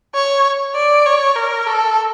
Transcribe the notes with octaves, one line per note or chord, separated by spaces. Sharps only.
C#5
D5
C#5
A#4
A4